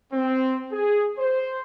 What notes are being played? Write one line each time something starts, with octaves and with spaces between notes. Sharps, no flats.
C4
G#4
C5